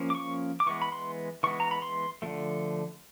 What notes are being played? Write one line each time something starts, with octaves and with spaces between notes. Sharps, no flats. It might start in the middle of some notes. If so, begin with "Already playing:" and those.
Already playing: F3 A#3 C#4
D6
C#6
D6
E3 G#3 B3 C#6
B5
C6
E3 G#3 B3 C#6
A#5
B5
C6
D3 F3 A3